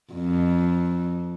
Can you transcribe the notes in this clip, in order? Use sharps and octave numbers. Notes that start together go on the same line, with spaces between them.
F2